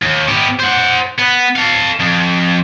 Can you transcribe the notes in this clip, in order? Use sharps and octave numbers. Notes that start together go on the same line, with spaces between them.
D#2
B3 G4
C5 F#5
B3
A4 F5
F2